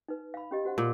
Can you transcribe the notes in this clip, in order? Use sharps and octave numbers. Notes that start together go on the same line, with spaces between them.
D#4 B4
F5 B5
C#4 G4 D#5
F#4 C5 F#5
A#2